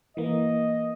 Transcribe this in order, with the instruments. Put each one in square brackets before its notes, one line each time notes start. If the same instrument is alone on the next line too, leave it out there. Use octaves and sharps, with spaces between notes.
[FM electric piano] E3 A#3 [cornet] D#5